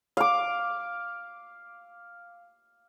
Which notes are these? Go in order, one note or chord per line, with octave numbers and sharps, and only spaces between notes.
F5 D6